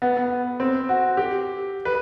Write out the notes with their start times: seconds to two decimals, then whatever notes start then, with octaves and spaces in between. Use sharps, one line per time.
0.02 B3
0.17 B3
0.60 C4
0.89 F#4
1.17 G4
1.85 B4